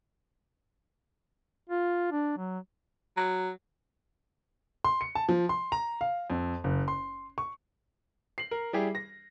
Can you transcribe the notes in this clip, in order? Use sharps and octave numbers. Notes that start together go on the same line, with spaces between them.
F4
D4
F#3
F#3
C6
C#7
A5
F3
C6
A#5
F5
F2
F#1
C6
C#6
C7 F#7
A#4
G3 E4 G4 G#4
A#6